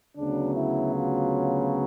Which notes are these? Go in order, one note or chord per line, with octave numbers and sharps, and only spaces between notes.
D2 C#3 F#3 B3 D4
E4
F4